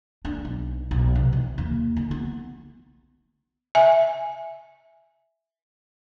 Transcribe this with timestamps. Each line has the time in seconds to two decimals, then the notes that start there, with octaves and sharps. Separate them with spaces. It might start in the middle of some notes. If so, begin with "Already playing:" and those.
0.25 D4
0.45 B1
0.91 B1
1.15 C3
1.33 E3
1.58 D#2
1.96 D3
2.11 B3
3.75 E5 G#5